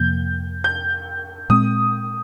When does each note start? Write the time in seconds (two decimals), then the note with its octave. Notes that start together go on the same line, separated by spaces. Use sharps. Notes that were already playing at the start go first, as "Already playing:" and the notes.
Already playing: F2 C3 F3 A#3 G6
0.64 G6
1.50 A#2 G#3 C4 D#6